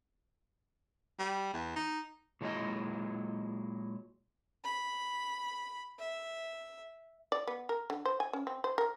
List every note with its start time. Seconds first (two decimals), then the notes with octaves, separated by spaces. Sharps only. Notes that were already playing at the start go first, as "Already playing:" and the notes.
1.19 G3
1.54 E2
1.76 D#4
2.41 A#2 D#3 F#3 G#3 E4 D#5
4.64 B5
5.99 E5
7.32 D5
7.47 B3
7.69 A#4
7.90 D3
8.05 C5
8.20 G#5
8.33 C#4
8.47 C4
8.64 C5
8.78 A#4